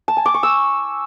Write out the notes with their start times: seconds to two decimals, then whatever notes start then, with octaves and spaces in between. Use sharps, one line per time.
0.08 A5
0.17 G#5
0.26 D6
0.34 C#6
0.43 E6